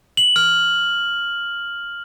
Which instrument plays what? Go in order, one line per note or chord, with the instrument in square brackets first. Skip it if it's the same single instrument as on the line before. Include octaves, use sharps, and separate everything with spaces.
[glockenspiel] F#7
F6